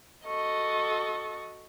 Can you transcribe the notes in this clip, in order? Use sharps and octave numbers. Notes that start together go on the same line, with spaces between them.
F#4 A4 D#5 C#6